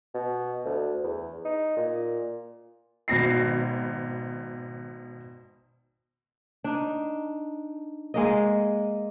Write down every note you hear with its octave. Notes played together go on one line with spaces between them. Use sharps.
B2
D2
E2
D#4
A#2
G#1 B2 A#6 C7
D4 D#4
G#3 A#3 D#5